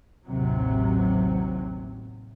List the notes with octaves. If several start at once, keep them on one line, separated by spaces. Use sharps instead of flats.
A1 D#2 C3 F#3